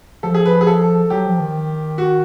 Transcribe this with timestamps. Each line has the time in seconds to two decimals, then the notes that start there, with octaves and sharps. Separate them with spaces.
0.23 F3 A4
0.34 G#4
0.46 B4
0.61 G#4
0.67 A4
1.10 F#3 G4
1.26 F3
1.40 D#3
1.98 F#4